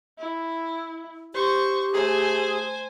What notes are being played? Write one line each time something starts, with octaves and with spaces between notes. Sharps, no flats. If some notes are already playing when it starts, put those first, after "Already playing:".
E4
G4 C5 C#6
A3 G#4 C5 G#5